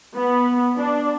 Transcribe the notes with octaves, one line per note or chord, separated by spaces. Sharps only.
B3
D4